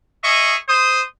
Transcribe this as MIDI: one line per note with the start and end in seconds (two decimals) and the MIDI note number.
0.24 0.55 68
0.24 0.55 75
0.24 0.55 76
0.24 0.55 85
0.69 1.02 72
0.69 1.02 87